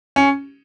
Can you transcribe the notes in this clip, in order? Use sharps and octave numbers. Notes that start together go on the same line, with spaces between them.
C#4